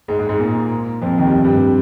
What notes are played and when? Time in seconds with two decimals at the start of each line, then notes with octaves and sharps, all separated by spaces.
0.08 G#2 G#3
0.19 G#2 G#3
0.29 G#2 G#3
0.39 A#2 A#3
1.02 F2 F3
1.18 D#2 D#3
1.27 G3
1.33 F2 F3
1.44 G2 G3
1.54 C3